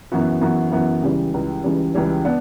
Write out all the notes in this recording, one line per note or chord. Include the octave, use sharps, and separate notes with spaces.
F#2 E3 B3 F#4
F#2 E3 B3 F#4
F#2 E3 B3 F#4
C#2 C#3 E3 G3
C#2 C#3 E3 G3
C#2 C#3 E3 G3
C#2 C#3 E3 G3
B3 D4